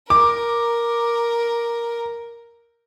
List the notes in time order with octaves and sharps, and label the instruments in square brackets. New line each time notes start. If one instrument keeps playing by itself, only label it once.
[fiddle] A#4 [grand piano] D6